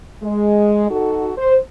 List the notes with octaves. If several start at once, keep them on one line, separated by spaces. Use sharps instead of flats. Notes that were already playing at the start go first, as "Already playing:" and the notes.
G#3
D#4 F#4 A4
C5